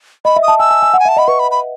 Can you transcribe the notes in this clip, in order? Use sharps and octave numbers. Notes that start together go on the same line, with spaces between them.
D#5 B5
E5
D#6
A5
G#5 E6
G#5
G#5
F#5
G#5
E5 A5
D#5 B5
B4 C#6
B5
B5